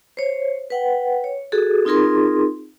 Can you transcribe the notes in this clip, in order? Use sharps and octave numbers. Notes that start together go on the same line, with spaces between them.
C5 C#5
B4 F#5 G5
C#5
F#4 G#4 A4
C4 D#4 F4 G#4 A#4 C6